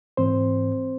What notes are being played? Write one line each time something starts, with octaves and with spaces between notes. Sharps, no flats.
G#2 E3 C4 C5